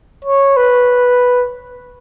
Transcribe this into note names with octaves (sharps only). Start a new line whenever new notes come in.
C#5
B4